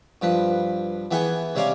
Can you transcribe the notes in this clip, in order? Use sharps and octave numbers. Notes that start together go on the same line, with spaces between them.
G2 F3 B4
E3 B3 G#4 G5 G#5 C#6
C3 G3 C#5 D5 F5 G#5